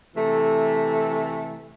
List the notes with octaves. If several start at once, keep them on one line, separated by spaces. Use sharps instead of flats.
C3 E3 A3